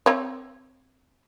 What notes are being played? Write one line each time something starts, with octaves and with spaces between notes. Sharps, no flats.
C4 C#5